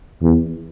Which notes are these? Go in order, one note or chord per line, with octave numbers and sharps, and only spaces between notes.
E2